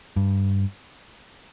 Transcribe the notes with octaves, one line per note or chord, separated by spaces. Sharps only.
G2